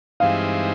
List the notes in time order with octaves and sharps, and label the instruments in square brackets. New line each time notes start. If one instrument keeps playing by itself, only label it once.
[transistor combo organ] G2 E3 G#3 C4 D#4 [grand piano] F5